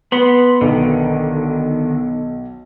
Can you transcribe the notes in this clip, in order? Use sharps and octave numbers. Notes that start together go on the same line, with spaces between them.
B3 B5 C6
B1 D3 D#3